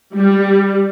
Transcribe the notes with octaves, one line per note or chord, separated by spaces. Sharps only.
G3